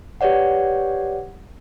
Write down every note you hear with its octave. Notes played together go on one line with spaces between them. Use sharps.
G4 B4 C#5 D5 F#5